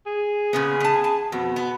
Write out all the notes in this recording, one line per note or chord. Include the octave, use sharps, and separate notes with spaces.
G#4
A#2 C#3 B3
B3 A5
A5
F2 B2
B3